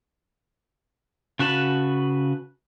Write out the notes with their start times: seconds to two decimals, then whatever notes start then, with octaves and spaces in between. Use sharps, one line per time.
1.39 C#3 F#4 B4 A5 B5